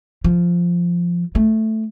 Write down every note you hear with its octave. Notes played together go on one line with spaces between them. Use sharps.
F3
A3